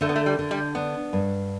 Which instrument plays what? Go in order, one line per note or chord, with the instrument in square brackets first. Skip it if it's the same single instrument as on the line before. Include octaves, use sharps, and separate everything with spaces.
[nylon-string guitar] D3 [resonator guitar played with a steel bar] A3
[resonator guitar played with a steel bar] B3
A3
G3
[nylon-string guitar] D3
[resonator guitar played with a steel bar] G3
[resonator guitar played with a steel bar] B3 [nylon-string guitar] D4
[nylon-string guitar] G2